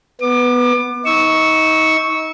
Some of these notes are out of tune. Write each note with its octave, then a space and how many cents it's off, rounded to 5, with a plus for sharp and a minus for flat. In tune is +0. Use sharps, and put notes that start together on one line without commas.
B3 +0 D6 +30
D#4 +30 C#6 +0 E6 -20